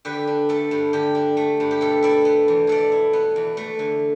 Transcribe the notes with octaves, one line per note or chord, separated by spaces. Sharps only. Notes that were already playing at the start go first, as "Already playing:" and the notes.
D3 G4 B4
D4
A3 A4
G2
D3 G4
D4
A3
G2
G4
B2 A4
E4 A4 D5
B3
E2
B2 A4 D5
E4
B3
E2
A3
D3